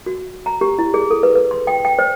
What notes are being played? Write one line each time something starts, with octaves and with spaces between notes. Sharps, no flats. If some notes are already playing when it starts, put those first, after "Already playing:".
F#4
A#5
G4
E4
G#4
A4
B4
B4
C6
G5
G5
C5